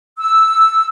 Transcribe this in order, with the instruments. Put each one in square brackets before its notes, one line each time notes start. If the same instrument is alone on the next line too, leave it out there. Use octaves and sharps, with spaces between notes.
[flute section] E6